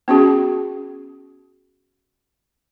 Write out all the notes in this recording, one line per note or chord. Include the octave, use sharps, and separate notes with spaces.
B3 C#4 F#4 G#4